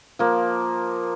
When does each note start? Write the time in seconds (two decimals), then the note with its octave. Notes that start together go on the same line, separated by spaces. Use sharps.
0.19 F3 A#3